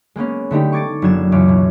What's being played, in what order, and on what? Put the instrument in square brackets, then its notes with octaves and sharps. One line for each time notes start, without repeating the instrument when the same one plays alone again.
[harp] G#3 A#3 B3 C#4
D3 A3 D#4 G4
C#6 D6 G#6 A6 C#7 D7
F#1 F#3 D4 G#6 E7
C#2 F#2 E3 C#5 D6
B2